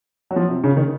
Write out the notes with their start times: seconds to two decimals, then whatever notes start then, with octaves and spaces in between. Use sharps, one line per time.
0.31 F#3
0.36 F3
0.49 C3
0.64 C#3
0.76 D#3